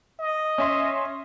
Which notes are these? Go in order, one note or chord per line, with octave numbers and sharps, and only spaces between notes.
D#5
C#4 E5 C6